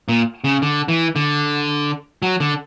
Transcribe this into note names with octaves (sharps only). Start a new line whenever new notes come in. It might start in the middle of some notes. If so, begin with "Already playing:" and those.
A#2
C#3
D3
E3
D3
F#3
D3